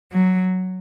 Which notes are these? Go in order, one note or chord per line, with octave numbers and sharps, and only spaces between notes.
F#3